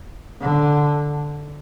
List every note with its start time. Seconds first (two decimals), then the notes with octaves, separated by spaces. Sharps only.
0.42 D3